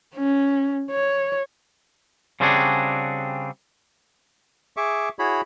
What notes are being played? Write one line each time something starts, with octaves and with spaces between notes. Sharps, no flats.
C#4
C#5
C#3 G3 C4 D4 F#4 G#4
G#4 E5 C#6 D6
E4 F#4 G#4 C#5 B5